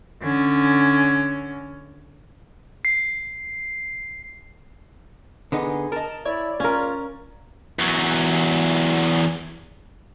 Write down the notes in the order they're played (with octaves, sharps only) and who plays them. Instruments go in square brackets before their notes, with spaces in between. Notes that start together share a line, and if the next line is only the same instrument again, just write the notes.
[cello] D3 C#4
[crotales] C7
[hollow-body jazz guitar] D3 B3 D#4 [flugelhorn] G#4
[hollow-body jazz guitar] A#4 D#5 [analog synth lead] A5
[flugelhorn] E4 [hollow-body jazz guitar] C#5 [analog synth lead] D5
[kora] C#4 A#4 [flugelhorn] F4
[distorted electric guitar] E2 F#3